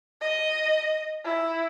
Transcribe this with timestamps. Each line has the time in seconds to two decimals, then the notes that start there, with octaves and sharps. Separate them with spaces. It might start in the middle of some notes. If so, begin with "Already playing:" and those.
0.21 D#5
1.25 E4